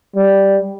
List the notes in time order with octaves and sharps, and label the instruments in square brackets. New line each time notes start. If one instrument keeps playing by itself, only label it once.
[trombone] G3